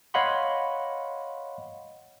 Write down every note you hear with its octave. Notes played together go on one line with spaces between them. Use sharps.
C#5 D#5 F5 F#5 B5 C6